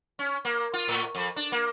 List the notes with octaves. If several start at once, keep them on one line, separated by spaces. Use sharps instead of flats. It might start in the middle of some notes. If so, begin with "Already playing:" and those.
C#4
A#3
F4
A2
F2
D4
A#3